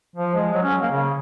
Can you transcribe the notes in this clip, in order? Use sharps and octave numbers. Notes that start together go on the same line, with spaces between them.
F3
G#3
F#3
C#4
A#3
C#3